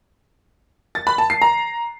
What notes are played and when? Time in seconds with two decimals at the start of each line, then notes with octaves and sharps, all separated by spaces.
0.95 A6
1.07 B5
1.18 A5
1.30 C7
1.41 A#5